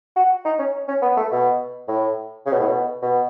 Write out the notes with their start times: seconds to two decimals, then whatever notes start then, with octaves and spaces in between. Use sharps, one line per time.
0.16 F#4
0.45 D#4
0.59 C#4
0.88 C#4
1.02 B3
1.17 A3
1.31 B2
1.88 A2
2.46 C#3
2.52 B2
2.59 A2
2.67 B2
3.02 B2